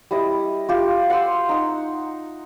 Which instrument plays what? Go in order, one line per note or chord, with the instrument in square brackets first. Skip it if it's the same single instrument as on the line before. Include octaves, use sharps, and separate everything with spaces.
[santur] G3 E4 D#5
F4 G4
F#5 G5 C6 E6
D#4 F#5 C6